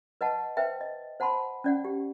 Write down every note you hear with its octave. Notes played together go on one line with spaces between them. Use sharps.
B4 D#5 F#5 A5
B4 C5 E5 G5
D#5
C5 F#5 A5 B5 C6
C#4 D5 F#5
G4